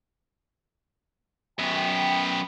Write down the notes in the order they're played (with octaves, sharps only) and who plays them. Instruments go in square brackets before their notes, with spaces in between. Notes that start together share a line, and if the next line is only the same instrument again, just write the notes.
[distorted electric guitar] F#2 B3 [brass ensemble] G5